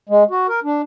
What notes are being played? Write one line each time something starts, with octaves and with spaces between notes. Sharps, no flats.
G#3
F#4
A#4
D4